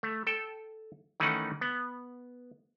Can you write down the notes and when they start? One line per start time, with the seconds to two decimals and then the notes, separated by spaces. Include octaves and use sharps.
0.03 A3
0.27 A4 G5
1.20 D#3 E3 A3 C#4 D#4 F#5
1.61 B3